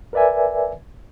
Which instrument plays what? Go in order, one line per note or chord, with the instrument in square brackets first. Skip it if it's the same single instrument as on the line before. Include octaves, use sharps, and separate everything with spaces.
[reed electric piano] A#4 B4 D5 E5 G#5